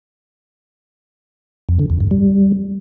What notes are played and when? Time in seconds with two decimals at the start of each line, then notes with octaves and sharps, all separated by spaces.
1.69 F2
1.79 D3
1.90 E2
2.00 G2
2.11 G3